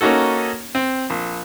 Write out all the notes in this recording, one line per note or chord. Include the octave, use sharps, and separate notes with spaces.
A#3 C#4 D#4 F#4 A4
C4
A#1